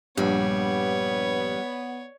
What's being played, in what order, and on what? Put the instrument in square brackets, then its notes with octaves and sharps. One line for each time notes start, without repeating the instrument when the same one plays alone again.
[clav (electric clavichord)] A#1 G2 [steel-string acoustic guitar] G3 [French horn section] B3 [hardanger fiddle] C#5